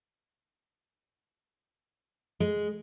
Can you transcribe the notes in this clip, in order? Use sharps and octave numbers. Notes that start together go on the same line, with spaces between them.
G#3